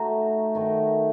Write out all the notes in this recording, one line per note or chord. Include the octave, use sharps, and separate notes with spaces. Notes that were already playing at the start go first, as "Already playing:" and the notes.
Already playing: A3 D#4 F#4
D#3 A3 D#4